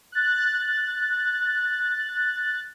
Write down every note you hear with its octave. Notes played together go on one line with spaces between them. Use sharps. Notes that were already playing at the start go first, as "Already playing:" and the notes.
F#6 A6